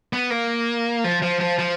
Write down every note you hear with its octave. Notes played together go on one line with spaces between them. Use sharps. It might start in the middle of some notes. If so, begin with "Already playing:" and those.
B3
A#3
F3
F3
F3
F3